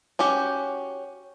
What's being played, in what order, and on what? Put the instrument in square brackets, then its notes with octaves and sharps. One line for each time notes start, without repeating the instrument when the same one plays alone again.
[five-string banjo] C#4 F#4 G4